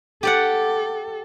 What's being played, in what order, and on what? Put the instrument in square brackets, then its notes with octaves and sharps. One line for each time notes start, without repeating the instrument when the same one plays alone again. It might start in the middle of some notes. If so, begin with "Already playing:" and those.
[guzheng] G4 D5 F#5 [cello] A4